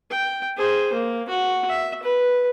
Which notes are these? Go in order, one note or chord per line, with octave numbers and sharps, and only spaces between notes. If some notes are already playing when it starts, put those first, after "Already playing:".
G5
G#4 C5
A#3
F#4
E5
B4